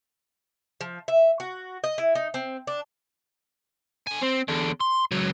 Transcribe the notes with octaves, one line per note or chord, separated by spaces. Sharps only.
F3
E5
F#4
D#5
E4
D#4
C4
D4
D3 G#5
C4
E2 D3
C6
C#2 F#3